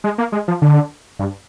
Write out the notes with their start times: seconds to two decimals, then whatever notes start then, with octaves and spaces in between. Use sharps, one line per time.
0.04 G#3
0.18 A#3
0.32 G#3
0.48 F3
0.62 D3
1.19 G2